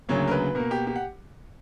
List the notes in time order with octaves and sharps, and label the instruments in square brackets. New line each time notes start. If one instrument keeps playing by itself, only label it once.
[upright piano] D2 C#3 F#3 A#3 C#5
A#4
B4
B2 A#3 A#4
G4
G4
F#5